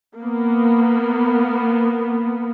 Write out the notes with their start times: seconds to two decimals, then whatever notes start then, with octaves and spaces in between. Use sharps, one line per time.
0.18 A#3 B3